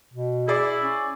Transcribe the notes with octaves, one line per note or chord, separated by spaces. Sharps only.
B2
E4 G#4 D5
C#4